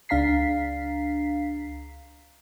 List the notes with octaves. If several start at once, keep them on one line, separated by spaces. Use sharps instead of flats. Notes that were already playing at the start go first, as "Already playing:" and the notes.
C#2 D4 F5 A#5 B6 C7